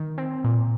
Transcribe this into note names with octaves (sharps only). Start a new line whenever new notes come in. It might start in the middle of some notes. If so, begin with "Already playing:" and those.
Already playing: D#3
C4
A#2